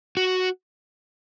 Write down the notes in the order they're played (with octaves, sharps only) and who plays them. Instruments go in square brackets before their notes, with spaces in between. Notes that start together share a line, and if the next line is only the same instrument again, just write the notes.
[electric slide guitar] F#4